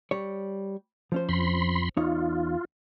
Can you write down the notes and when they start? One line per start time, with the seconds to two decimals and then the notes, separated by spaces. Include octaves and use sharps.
0.11 G3 C#5
1.12 F3 C#4 C5
1.29 F2 B5 C6
1.97 E2 D#4 F4 C#5